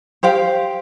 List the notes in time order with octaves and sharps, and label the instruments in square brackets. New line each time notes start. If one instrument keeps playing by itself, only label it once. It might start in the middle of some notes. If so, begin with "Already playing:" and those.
[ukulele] G4 C5 F5 G5